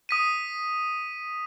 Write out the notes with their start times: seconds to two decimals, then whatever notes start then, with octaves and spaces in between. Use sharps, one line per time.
0.09 D#6 B6 D#7